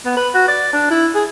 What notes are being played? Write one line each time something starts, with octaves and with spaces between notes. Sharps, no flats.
B3
B4
F#4
D5
D4
E4
G#4